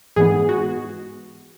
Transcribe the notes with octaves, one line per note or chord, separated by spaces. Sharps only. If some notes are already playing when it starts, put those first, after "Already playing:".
G#2 E3 G#3 B3 G#4
F#4